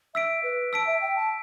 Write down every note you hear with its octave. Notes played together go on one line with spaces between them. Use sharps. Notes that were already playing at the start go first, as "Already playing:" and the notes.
E5 E6 B6 D7
B4
A5 E6 B6 D7
E5
G5
A5